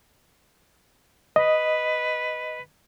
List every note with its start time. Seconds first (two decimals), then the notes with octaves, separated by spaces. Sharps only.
1.36 B4 D#5